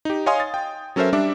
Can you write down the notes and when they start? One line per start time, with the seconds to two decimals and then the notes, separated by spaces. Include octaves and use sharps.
0.05 D#4 G4
0.26 C#5 D#5 F5 G#5 C6 D#6
0.40 A6
0.54 G5
0.96 F#3 C#4 A4 A#4 C5 E5
1.13 G3 D4 E5 D6